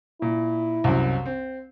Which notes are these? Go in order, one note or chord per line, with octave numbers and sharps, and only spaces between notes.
A#2 E4
C2 F#2
C4